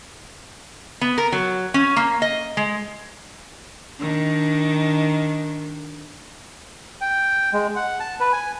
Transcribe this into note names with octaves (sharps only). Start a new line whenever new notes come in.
B3
A#4
F#3
C#4
A#3
D#5
G#3
D#3 D4
G5
G#3
F#5
A5
B4
G#5